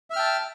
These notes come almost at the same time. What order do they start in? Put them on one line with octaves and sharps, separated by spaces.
E5 F6 G5 A5